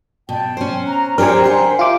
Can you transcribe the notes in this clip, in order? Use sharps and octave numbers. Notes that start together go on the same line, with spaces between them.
B2 G5 A5
C#4 C5
A#5 F#6
D4 G4 A#4 C5 C#5 G#5
G4 D5 F#5
F4 E5 D6